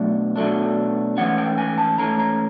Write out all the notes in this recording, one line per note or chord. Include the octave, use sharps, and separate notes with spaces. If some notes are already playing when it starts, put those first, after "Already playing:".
Already playing: B2 F#3 A3 D4
B2 F#3 A3 D4
G#2 E3 A3 C#4 F#5
G5
G#5
A5
G#2 E3 A3 C#4 A#5
A#5